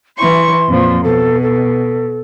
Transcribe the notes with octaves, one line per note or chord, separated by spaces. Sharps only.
E3 E4 C6 C#6
F2 A#2 F3
B2 A4
A4